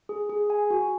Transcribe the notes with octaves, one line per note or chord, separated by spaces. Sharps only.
G#4
G#4
G#5
F#4